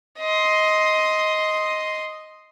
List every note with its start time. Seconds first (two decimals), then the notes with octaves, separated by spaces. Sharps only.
0.20 D#5 C6